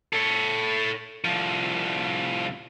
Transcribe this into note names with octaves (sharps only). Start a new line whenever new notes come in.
A4 C#5
C2 F3